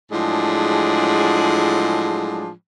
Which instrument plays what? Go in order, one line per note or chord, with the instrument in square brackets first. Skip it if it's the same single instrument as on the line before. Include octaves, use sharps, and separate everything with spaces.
[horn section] A2 F3 F#3 G#3 D4 G#4